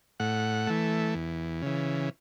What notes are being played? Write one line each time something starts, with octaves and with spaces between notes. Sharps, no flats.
A2 F#5
E3 A3
E2
C#3 E3